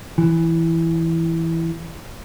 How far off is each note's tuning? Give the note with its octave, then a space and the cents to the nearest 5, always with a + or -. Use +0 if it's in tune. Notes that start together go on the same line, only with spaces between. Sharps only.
E3 +0